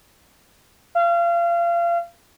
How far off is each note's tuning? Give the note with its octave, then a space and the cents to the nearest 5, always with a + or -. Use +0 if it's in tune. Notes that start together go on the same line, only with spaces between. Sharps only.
F5 -30